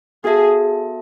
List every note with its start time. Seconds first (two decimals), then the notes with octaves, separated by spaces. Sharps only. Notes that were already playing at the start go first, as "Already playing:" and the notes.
0.24 B3 F#4 G#4 A4 E5 A5